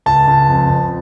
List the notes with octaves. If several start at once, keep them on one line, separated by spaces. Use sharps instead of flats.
C#2 A5
C#2
F2
F2